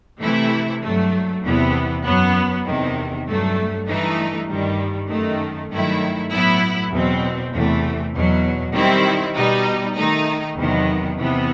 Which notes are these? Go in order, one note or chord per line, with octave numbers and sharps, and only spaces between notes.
C3 E3 A3 E4
G2 F#3 A3
E2 C3 E3 B3
F#2 F#3 B3
E2 C3 D#3
G2 F#3 A3
G2 E3 A3 D#4
G2 D#3 G3
F#2 D#3 A3
G2 D#3 F#3 A3 E4
A2 F#3 B3 E4
E2 B2 F#3 C4
E2 C3 E3 A3
E2 B2 F#3
D#3 G3 C4 E4
B2 G3 D#4
D#3 A3 D#4
E2 C3 D#3 F#3 B3
E2 C3 E3 B3